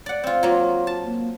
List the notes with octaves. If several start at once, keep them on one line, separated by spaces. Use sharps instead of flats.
D5 F#5
C4 F4
F#3 A#3 F4
A5
A#3